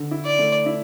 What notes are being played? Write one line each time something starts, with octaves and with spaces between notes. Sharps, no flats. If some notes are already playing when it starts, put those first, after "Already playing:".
Already playing: D3
E4
D5
A3
E4